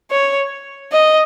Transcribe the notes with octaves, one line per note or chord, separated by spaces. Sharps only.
C#5
D#5